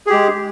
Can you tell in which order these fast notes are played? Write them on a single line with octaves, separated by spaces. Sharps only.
G#4 G4 G#3